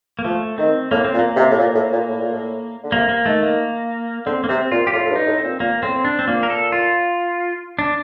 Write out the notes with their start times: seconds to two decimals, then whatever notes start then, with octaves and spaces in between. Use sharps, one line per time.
0.19 A#3
0.24 F3 A3
0.58 D#3 C4
0.91 A2 A#3
1.05 C4
1.14 A#2
1.19 A#3
1.36 C3
1.51 A2
1.59 A#2
1.75 A2
1.92 A#2
2.08 A2
2.21 A#2
2.32 A2
2.84 D3
2.92 C3 A#3
3.09 A#3
3.26 D#3 A3
3.43 A#3
4.26 D3 C4
4.44 A#3
4.49 C3 C4
4.72 A#2 F4
4.87 G4
4.93 A2 F4
5.06 A2
5.11 G2
5.16 D#4
5.27 A2
5.38 C4
5.44 A#2
5.60 A#2 A#3
5.83 A2 C4
6.05 D4
6.19 C4
6.27 A#2 A#3
6.43 A#4
6.50 A4
6.72 F4
7.79 D4